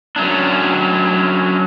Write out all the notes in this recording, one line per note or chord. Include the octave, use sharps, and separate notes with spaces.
F#3 C#4 D4